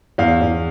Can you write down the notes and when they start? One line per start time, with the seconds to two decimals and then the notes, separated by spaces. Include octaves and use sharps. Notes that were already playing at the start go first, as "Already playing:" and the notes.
0.18 E2 F5
0.41 E2